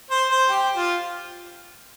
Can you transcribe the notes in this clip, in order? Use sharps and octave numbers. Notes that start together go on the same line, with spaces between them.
C5
C5
G4
F4